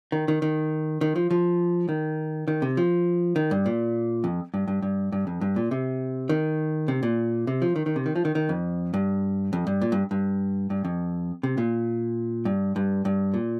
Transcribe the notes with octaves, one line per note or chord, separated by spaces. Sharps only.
D#3
D#3
D#3
D#3
F3
F3
D#3
D#3
C3
F3
D#3
G2
A#2
F2
G2
G2
G2
G2
F2
G2
A#2
C3
D#3
C3
A#2
C3
F3
D#3
D#3
C3
D#3
F3
D#3
D#3
F2
G2
F2
G2
A#2
G2
G2
G2
F2
C3
A#2
G2
G2
G2
A#2